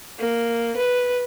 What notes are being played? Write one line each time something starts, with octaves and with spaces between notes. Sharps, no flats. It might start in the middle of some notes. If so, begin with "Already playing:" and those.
A#3
B4